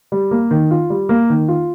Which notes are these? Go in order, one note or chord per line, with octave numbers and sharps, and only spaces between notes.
G3
A#3
D#3
F4
G3
A#3
D#3
F4